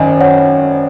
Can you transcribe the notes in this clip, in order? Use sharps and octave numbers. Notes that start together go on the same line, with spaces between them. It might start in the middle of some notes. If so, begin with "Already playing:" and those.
Already playing: G#1 F#2 D#3 D#5 G#5
C#5 F#5